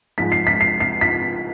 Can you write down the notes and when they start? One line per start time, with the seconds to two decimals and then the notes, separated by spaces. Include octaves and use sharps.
0.18 G#2 F3 G#3 B6
0.32 C7
0.47 B6
0.61 C7
0.80 C7
1.01 B6